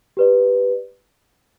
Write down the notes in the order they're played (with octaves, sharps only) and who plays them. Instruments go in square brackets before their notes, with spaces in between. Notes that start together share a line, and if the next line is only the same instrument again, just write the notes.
[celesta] G4 B4 D5